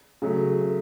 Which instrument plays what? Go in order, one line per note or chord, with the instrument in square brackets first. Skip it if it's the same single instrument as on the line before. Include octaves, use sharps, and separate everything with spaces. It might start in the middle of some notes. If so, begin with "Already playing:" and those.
[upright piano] C#3 F#3 A3